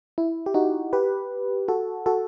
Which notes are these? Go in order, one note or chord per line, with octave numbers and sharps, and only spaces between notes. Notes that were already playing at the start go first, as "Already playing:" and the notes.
E4
G4
D#4 F#4
G4 B4
F#4 A4
F#4 A4